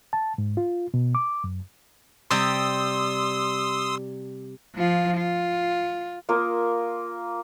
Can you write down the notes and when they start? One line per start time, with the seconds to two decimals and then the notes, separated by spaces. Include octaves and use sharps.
0.13 A5
0.38 G#2
0.57 F4
0.94 B2
1.15 D6
1.44 F#2
2.31 C3 G3 C6 D#6 E6
4.75 F3 F4
5.17 F4
6.29 A#3 F4 A#4 D#6